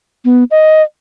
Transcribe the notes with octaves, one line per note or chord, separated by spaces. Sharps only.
B3
D#5